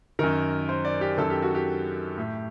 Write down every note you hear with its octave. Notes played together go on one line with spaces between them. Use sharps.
F#2 D#3 A#4
C5
D5
G4
F#2 D#3 A4
G4
F#4
G4
A2